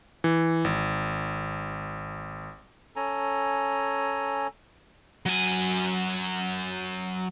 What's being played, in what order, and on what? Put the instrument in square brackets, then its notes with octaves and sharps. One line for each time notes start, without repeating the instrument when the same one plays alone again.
[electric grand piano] E3
G#1
[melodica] C#4 A4 G#5 A#5
[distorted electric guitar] F#3 G#5